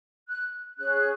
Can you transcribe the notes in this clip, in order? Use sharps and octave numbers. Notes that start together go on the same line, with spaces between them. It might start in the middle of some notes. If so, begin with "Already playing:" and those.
F#6
C#4 G#4 C#5 F#6